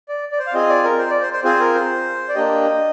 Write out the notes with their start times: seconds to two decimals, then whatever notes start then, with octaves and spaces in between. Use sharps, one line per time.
0.09 D5
0.32 D5
0.39 C5
0.47 F5
0.54 C4 F4 G#4 D#5
0.69 D5
0.84 A#4
0.98 C5
1.10 D5
1.22 C5
1.33 C5
1.44 C4 F4 G#4 C5
1.60 A#4
1.75 C5
2.29 D5
2.35 A#3 D4 G4 D#5